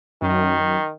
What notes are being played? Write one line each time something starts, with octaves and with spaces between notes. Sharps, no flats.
F#2 D#3